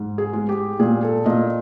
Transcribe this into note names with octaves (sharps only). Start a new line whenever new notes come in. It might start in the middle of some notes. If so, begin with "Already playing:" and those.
Already playing: G#2
G#4
G#3
G4
A#2 G#4
A4
A#2 D#5